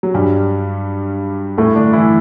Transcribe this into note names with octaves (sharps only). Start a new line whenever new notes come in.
F#3
G2 G3
A2 A3
D3 D4
E3 E4